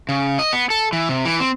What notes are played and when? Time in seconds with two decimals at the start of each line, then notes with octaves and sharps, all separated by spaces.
0.09 C#3
0.39 D#5
0.53 B3
0.70 A4
0.93 E3
1.09 C3
1.25 E3
1.40 C4